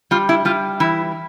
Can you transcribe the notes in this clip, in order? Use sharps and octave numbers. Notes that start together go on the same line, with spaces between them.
G3 F4
E4
G3 F4
E3 E4